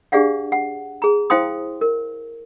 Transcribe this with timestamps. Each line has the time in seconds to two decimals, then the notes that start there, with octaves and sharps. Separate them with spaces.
0.12 D4 G4 G#4 D5 F5 F#5
0.52 F#5
1.02 G#4 A#5
1.30 E4 C5 F5 G5 C6 D#6
1.81 A#4